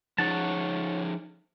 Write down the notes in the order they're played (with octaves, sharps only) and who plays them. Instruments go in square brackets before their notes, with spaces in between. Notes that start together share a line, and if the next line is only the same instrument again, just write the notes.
[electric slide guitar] F3 D#4 G#4 [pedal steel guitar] C#5 F#5 A5